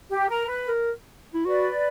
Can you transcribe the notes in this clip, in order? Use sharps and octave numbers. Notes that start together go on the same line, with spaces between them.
G4
A#4
B4
A#4
E4
F#4 B4 D5